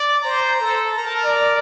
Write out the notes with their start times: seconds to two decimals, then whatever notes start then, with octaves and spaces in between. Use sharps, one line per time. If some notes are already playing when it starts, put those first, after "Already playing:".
Already playing: D5
0.23 C5 A#5
0.60 A4
0.97 A#4 A#5
1.06 A5
1.25 D5